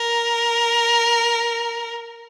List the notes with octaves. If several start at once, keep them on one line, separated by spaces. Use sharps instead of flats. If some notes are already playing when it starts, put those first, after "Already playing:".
Already playing: A#4